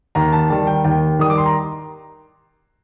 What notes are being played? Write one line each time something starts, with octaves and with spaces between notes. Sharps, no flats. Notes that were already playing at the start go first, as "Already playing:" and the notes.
D#2 A#5
A5
D#3 G3 A5
G5
D#2 G5
D#3 G3 D#6
D6
C6
A#5